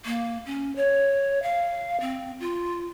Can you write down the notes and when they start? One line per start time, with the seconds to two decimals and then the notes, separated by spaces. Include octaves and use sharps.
0.05 A#3
0.46 C#4
0.76 C#5
1.43 F5
2.01 C4
2.40 F4